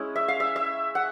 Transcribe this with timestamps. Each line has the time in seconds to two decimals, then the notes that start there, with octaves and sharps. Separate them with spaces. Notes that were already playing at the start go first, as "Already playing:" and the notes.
Already playing: G#3 C#4 E4
0.16 E5
0.28 F5
0.40 E5
0.56 E5
0.95 F#5